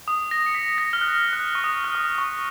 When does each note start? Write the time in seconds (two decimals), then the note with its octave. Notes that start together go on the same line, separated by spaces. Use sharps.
0.08 D#6
0.31 A#6
0.46 C#7
0.55 B6
0.78 A#6
0.93 F6
1.01 F#6
1.33 F#6
1.55 C#6
1.64 D#6
1.84 F6
1.95 D#6
2.18 C#6